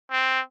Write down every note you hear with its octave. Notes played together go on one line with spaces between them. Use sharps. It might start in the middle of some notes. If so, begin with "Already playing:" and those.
C4